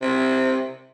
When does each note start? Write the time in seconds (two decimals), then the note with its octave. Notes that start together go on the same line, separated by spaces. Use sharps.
0.02 C3